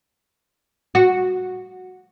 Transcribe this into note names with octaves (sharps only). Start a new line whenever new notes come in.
F#4